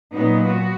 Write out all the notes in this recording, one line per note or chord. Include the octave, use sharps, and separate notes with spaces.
A#2 F#3 B3 D#4
F#4